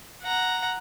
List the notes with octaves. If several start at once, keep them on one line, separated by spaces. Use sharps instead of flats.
F#5 A#5